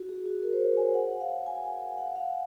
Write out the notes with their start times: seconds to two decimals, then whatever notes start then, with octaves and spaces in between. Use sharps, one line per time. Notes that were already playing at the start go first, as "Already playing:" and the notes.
Already playing: F#4
0.09 G#4
0.26 F#4
0.43 A#4
0.52 C5
0.61 C#5
0.77 G#5
0.94 F#5
1.21 F5
1.46 G#5
1.64 F#5
1.98 F#5
2.16 F5